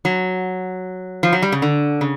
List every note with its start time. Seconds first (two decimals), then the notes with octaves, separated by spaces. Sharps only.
0.05 F#3
1.23 F3
1.33 F#3
1.42 G3
1.52 C#3
1.62 D3
2.01 C#3